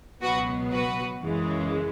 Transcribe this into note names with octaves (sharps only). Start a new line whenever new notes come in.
C#2 B2 F#3 B3 F#4 B4
F#4 B4
F#2 C#3 E3 G#3